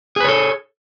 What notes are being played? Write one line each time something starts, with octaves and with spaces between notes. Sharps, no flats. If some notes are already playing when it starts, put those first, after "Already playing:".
G#4 A4 B4 C#5